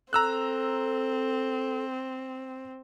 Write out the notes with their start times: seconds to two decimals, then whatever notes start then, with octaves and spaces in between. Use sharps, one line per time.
0.13 C4 A4 A#5 E6 F#6